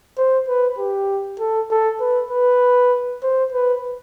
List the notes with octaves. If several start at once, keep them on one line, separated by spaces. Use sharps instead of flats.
C5
B4
G4
A4
A4
B4
B4
C5
B4